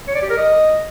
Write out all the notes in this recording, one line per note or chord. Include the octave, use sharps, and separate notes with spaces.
C#5
D5
G4
A#4
D#5